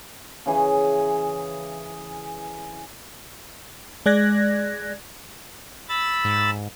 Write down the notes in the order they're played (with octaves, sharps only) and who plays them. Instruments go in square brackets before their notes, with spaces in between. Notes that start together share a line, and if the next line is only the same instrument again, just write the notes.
[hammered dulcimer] C#3 E3 G#4
[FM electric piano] G#3 D5 F#6 G#6 A#6
[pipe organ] B5 E6 A6
[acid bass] G#2